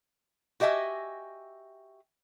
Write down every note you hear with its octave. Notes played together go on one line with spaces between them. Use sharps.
F#4 G4 D#5 E5 G#5